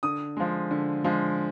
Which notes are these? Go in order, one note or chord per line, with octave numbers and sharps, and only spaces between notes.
D3 D#6
F3 G#3
D3
F3 G#3